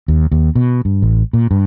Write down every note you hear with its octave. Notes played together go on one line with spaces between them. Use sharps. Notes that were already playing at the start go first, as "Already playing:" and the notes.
D#2
D#2
B2
G2
A1
A#2
G2